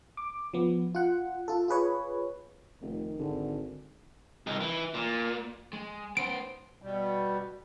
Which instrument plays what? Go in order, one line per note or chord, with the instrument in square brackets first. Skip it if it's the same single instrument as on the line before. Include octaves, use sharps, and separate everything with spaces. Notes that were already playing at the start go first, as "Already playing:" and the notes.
[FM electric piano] D6
F3 B3
F4 F#5
F4 A4
F4 G#4 B4 C#5
[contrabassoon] F1 [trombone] D#3
[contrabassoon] G#1 [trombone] D3
[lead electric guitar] C2 D#3
E3
A#2
G#3
[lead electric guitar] B3 C5 [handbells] D7
[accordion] B2 G3